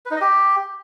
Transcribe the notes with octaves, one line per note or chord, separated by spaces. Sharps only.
B4
D#4
D#5
G4